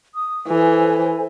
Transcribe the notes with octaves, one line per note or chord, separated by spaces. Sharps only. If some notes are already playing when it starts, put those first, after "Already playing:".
D#6
E3 A4 C5 G#5